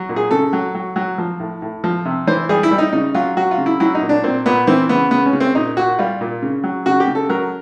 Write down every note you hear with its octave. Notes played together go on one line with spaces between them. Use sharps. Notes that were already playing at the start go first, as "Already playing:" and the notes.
Already playing: F#3
A#2
G#4
C#3 A4
F#3
F#3
F#3
F3
A2
A2
F3
C3
E3 C5
G3 G#4
E4
G3
D#4
C#3 D#4
F#3 F4
F#3 F#4
F4
C#3
E4
F#3 E4
D#4
A#2
D4
A#2 C4
A#2 B3
E3 C4
C#3 B3
C#3 B3
C#4
C#3
C4
A#2 D#4
A#2 F#4
G3 F4
A#2
C#3
F#3
C#3 F#4
G4
C#3
A4
F#3 A#4